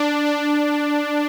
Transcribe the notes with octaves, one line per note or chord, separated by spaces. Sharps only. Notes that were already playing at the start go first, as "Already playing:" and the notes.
Already playing: D4
D4